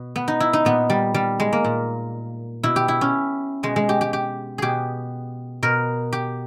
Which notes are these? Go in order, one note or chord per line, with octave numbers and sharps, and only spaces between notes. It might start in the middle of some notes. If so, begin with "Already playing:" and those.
Already playing: B2
B3
D#4
E4
D#4
A#2 B3
G3
G3
G#3
A#3
A#2
B2 E4
G4
E4
C#4
B2 G#3
G#3
G4
G4
G4
B2 G4 G#4
B2 A#4
G4